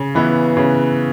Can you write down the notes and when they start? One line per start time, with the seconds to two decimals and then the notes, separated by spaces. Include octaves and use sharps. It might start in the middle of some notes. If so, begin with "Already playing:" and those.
Already playing: C#3
0.15 E3 B3 E4
0.57 C#3